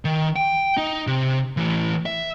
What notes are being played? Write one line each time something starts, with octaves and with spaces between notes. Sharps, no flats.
D#3
G5
D#4
C3
A2 E3
E5